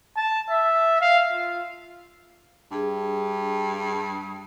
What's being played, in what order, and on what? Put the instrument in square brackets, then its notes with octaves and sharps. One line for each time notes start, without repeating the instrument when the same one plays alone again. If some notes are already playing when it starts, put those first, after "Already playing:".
[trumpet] A5
E5
F5
F4
[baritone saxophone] G2 [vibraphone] D4 G#4